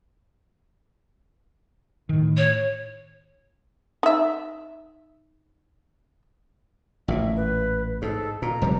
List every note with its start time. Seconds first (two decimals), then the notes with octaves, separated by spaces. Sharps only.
2.09 A2 D#3
2.37 C#5
4.03 D#4 E5
7.08 A1 A#2 E5
7.36 B4
8.02 G#2 A4
8.42 A#2 A#5
8.62 F1 F3 G3